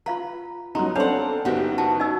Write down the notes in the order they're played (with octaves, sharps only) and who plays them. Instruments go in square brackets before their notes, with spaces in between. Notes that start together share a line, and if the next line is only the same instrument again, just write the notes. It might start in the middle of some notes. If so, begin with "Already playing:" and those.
[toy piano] F4 F5 A#5 [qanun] B4
[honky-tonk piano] F#3 D#4 [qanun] B3 [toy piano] A#5 C6
[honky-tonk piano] C4 D4 A4 [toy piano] C#5 C6 [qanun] F5 F#5
[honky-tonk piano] F#1 B3 [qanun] D#4 F#4 G4
[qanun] F#4 [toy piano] A5
[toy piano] D#4 D#5 E6